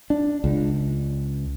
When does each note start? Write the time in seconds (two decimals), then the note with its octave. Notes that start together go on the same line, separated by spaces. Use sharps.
0.10 D4
0.44 C#2